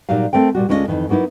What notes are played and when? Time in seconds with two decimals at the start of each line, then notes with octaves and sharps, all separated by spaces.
0.09 A#2 F#3 G3 D#4 F5
0.33 A3 C4 A#4 G5
0.55 A#2 C#3 G3 F#4
0.69 D2 G#3 C#4 E4 F4 D#5
0.88 F2 G#2 D#3 E3
1.09 F#3 A#3 B3 D#4 E4